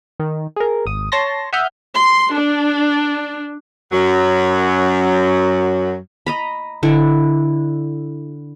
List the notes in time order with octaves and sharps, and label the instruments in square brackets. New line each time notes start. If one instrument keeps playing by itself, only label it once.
[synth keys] D#3
G#4 A#4
G#1 D#6
C#5 A5 C6 A#6
E5 F#5 D#6 F6 G6
[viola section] C6
D4
[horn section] F#2 F#3
[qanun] D#5 A#5 B5
D3 E4